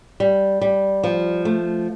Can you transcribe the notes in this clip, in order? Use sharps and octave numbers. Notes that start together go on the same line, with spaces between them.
G3
G3
F3
A3